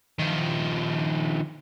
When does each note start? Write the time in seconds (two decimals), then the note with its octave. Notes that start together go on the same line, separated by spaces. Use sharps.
0.19 D#3 F3